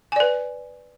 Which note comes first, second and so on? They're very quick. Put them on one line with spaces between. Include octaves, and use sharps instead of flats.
G#5 D5 B4